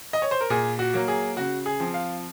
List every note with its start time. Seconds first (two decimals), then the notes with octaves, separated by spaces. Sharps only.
0.13 D#5
0.22 C#5
0.31 C5
0.41 A#4
0.50 A#2 G#4
0.79 F#4
0.94 F#3 A#3
1.08 G#4
1.37 C#3 F#4
1.66 G#4
1.80 F3 C4
1.94 F5